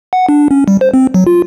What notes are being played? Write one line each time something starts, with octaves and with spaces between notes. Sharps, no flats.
F#5
D4
C#4
G3
C5
C4
F#3
F4